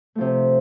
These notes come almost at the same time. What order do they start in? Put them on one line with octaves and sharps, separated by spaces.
A3 F3 C3